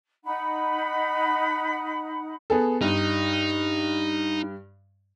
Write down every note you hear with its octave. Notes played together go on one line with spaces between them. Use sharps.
D#4 F#5 B5
B3 G#4 A4
G2 D#4